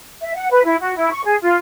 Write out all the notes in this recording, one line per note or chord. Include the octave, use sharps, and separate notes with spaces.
E5
F#5
B4
E4
F#4
E4
C#6
G#4
F4